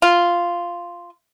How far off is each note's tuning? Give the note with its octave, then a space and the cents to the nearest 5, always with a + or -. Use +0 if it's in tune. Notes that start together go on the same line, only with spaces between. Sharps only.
F4 -5